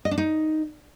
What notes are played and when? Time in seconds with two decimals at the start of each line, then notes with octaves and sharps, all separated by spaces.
0.05 D#5
0.11 D4
0.18 D#4